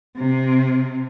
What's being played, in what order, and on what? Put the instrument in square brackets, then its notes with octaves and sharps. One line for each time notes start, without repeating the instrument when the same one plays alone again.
[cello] C3